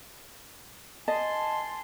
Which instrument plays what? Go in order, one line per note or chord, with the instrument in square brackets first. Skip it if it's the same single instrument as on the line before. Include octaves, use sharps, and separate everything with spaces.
[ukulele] D#5 [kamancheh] G#5 C6 [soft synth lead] A5